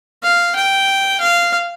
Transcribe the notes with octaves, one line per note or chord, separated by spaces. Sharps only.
F5
G5
F5